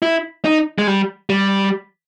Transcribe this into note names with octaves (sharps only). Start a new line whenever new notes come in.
E4
D#4
G#3
G3
G3